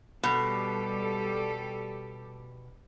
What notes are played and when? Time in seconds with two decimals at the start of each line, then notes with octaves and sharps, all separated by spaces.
0.23 B2 G3 G4 A4